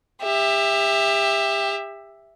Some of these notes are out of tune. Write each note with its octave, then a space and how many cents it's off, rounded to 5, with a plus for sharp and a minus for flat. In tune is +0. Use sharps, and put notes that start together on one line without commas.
G4 +30 E5 +0